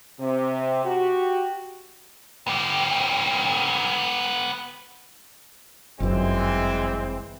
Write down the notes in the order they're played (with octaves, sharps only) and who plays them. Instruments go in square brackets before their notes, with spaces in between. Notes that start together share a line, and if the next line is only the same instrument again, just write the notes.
[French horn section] C3
F#4 G4
[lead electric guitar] B3 G4
[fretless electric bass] G1 F#2 [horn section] E3 G#3 C4